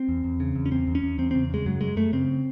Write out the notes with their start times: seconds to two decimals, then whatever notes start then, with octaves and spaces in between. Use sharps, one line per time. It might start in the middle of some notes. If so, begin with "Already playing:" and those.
Already playing: C4
0.09 E2
0.24 E2
0.40 C#3
0.55 E2
0.66 C#4
0.71 E2 C4
0.87 E2
0.95 C#4
1.03 E2
1.18 E2 C4
1.31 C#3 C4
1.50 C#3 G#3
1.66 F#2 F#3
1.81 F#2 G#3
1.96 F#2 A3
2.13 C#3 C4